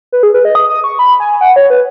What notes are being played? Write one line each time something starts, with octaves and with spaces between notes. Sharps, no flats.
B4
G#4
B4
D#5
D#6
D#6
C#6
B5
G#5
F#5
C#5
B4